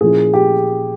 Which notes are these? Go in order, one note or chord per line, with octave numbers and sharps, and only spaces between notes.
A#2 F3 A#3 C#4 E4 G#4
G4